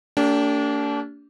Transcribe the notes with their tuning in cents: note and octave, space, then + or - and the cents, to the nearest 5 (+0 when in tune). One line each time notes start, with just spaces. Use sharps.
A#3 -45 D4 -30 G4 +0